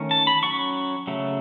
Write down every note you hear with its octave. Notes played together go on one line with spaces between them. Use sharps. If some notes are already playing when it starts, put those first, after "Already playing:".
Already playing: D#3 A3 C#4
A5
B5
F#3 C#4 C#6
C#3 F#3 A3